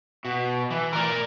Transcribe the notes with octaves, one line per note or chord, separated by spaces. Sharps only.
B2
E3
A#4 D5